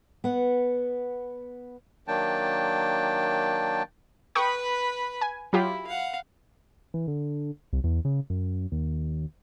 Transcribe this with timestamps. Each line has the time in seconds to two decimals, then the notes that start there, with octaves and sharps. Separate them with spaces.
0.24 B3 F#5
2.08 D#3 F#3 A#3 D4 G5 A5
4.35 B4 G5 B5 C#6 D#6
5.21 G#5
5.53 F#3 E4 F4 G4
5.87 F5 F#5
6.94 E3
7.08 D3
7.73 C2
7.84 E2
8.05 C#3
8.30 F#2
8.72 D#2